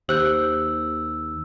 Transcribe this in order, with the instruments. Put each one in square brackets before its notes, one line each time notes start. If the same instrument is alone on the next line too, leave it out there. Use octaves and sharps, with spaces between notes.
[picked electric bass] D#2 [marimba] G4 [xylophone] C5 F#6 G6 [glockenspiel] E6